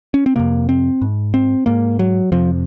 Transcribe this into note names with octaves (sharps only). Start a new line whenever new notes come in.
C#4
C4
F2 C3 A#3
C4
G#2
C4
G#2 A#3
F#3
F2 C3 F3